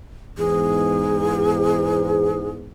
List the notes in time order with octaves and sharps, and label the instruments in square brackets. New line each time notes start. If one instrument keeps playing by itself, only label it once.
[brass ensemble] E2 G#2 [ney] G#4